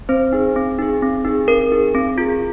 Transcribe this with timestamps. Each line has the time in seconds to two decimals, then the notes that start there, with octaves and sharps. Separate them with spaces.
0.09 C4 C5
0.33 D#4 G#4
0.56 C4
0.79 D#4 G#4
1.02 C4
1.25 D#4 G#4
1.48 C4 A#4
1.71 D#4 G#4
1.95 C4
2.18 F4 G#4